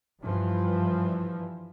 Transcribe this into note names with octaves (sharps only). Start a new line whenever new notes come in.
G2 E3 F3